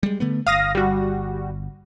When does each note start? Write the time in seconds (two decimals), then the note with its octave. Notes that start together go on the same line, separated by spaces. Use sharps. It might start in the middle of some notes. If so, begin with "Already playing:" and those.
0.03 G3 G#3
0.20 D3 A3 B3
0.47 G1 F5 D#6 A#6
0.75 G3 F#4